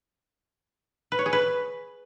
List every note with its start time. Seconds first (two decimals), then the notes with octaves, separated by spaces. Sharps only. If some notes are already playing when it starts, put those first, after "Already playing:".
1.12 B4
1.19 C#5
1.26 G#4
1.33 B4